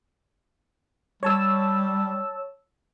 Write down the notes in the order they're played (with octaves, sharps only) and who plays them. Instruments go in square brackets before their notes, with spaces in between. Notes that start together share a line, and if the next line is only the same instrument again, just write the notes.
[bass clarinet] G3 [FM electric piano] C#5 A5 E6